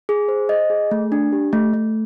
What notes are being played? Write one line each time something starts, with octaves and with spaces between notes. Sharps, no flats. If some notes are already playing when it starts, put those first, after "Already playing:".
G#4
C5
D#5
G#4
A3
D4
G4
A3
A3